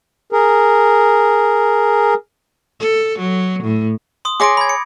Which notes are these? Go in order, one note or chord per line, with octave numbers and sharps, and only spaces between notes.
G#4 A#4
A4
F#3
A2
C6 D#6
G#4 C#5 C6 D6 A#6 D7
B5 G#6
C#7